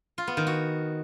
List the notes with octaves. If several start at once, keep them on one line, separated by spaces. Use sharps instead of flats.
F4
B3
D#3
F#4